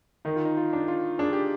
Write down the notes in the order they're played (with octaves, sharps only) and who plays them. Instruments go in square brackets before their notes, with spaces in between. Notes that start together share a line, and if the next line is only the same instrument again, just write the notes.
[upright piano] D#3 [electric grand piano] D#4
[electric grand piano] F4
D#4
F4
[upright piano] D4
[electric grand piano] F4
[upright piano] D4 [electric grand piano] G#4
[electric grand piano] G4